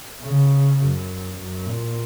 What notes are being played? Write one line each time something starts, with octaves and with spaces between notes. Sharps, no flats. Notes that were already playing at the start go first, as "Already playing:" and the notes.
C#3
F#2
F#2
A#2